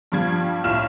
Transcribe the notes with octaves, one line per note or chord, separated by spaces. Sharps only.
G2 F3 G3 G#6
C2 A2 F4 F6 E7